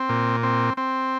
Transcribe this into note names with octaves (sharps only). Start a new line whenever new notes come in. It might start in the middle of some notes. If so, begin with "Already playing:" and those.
Already playing: C4
A#2
C4
C4